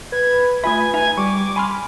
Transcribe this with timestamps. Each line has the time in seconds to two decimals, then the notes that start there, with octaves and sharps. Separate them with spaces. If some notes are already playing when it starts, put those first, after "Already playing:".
0.12 B4 G#6
0.64 A3 F4 E5 G#5 B5
0.94 D#4 E5 G#5 A#5
1.17 G3 C#6 D6
1.56 G#5 B5 C6 F6